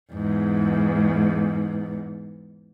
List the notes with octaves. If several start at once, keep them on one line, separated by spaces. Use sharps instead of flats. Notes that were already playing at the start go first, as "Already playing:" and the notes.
E2 G#2